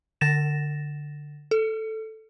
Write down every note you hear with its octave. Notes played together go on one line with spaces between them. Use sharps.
D3 A6 A#6 E7
A4